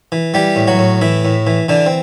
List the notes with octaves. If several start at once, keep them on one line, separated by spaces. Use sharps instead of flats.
E3
E3 G3 G4
A2
F#3 F#4
A2
E3 E4
A2
E3
D3 E3 D4
C4